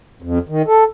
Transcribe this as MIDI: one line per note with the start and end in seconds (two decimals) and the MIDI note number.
0.22 0.39 41
0.49 0.62 51
0.67 0.84 69